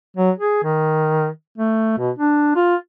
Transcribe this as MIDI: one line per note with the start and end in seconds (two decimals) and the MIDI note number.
0.16 0.31 54
0.38 0.61 68
0.64 1.28 51
1.58 1.94 57
1.98 2.11 47
2.19 2.53 62
2.56 2.76 65